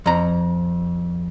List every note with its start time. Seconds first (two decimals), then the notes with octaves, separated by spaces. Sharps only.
0.06 F2 A#5